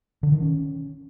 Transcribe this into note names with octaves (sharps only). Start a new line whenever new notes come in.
D3
D#3
C#4